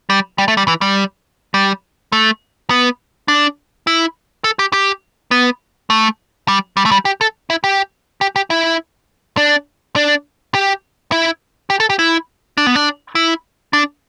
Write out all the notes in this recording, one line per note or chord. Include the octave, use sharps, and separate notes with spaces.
G3
G3
A3
G3
E3
G3
G3
A3
B3
D4
E4
A4
G4
G4
B3
A3
G3
G3
A3
G3
G4
A4
E4
G4
G4
G4
E4
D4
D4
G4
E4
G4
A4
G4
E4
D4
B3
D4
E4
D4